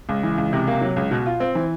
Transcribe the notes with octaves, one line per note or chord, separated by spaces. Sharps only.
C#2
E3
C#2
C3
A#3
F#3
C#2
B2
F4
C4
E3